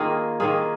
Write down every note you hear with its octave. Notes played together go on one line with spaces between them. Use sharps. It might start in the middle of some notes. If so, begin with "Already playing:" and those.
Already playing: D#3 A#3 F4 G#4
D#3 A#3 F4 G#4